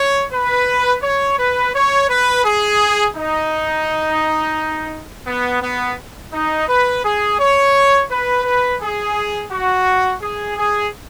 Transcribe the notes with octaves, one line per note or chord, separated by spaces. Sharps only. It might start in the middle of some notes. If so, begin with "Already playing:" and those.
Already playing: C#5
B4
C#5
B4
C#5
B4
G#4
D#4
B3
B3
D#4
B4
G#4
C#5
B4
B4
G#4
F#4
G#4
G#4